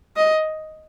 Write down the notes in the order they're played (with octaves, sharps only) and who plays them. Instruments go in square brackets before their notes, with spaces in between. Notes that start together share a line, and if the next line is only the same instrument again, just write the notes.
[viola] D#5